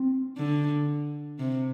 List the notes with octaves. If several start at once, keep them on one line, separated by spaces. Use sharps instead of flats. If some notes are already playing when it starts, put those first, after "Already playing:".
Already playing: C4
D3
C3